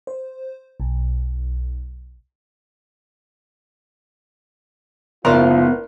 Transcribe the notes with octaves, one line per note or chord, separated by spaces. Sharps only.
C5
B1
F#1 G#2 F3 B3 F4 A#4 C5 D5